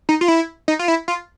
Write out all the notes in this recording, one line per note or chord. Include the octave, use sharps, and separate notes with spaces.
D#4
F4
E4
D#4
F4
E4
F4